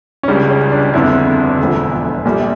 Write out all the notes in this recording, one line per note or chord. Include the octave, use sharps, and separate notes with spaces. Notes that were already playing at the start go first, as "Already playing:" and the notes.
C#4
C#2 C#3 G3 D4
C#4
D4
G1 F2 D3 E4
E1 D2 D3 F3
A#1 A#2 G3